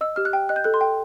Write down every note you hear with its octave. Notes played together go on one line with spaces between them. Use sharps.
D#5 E6
G4 F6
F#6
G5
D#5 F#6
G6
A4 F#6
C6
G5